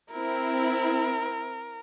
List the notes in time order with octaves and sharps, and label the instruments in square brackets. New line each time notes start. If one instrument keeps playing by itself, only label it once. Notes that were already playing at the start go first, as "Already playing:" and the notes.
[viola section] C4 E4 [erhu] A#4